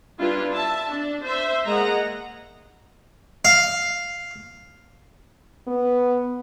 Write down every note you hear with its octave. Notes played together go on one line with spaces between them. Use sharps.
G3 D4 E4 F4 B4
E5 A5
D4
C5 E5
G#3 A#3 D#5 F#5 A#5
F5
B3